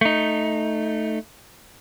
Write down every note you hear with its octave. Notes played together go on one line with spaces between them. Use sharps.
A3 D#4